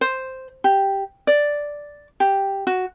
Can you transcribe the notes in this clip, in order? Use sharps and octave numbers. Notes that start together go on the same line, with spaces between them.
C5
G4
D5
G4
F#4